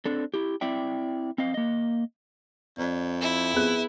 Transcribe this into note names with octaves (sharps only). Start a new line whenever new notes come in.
C4 D4 A4
E4 G4
C4 E4 D5 E5 G5
C4 D#5 F5
A#3 D#5
F2 D5
E4
B3 G#4 F#6